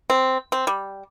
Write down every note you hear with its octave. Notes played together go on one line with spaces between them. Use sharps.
C4
C4
G3